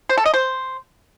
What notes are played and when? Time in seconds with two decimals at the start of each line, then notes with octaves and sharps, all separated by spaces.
0.09 C5
0.17 A4
0.25 D#5
0.34 C5